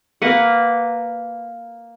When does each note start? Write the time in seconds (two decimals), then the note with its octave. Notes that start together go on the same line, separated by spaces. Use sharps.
0.22 A#3 B4 F#5